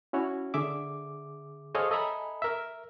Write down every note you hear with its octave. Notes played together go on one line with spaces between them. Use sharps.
C#4 E4 F#4 C#5
D3 G#4 E5 D6
G#4 A4 C5 C#5 D#5 F5
A4 D#5 E5 G#5 A#5 B5
A#4 E5